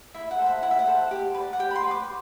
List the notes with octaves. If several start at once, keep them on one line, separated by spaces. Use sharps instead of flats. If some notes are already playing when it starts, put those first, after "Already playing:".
E4 E5
F#5
A4 C5
E5
E4 F#5
E5
F#5
A4 C5
G4
B4
D5
F#5
G4 G5
B5
C6
B4 D5
D6